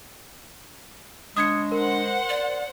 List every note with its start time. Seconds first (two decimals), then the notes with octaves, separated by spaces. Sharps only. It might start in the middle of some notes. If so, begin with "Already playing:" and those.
1.37 G#3 D4 D#6 G#6 C#7
1.72 A#4 C5 F#5
2.29 D5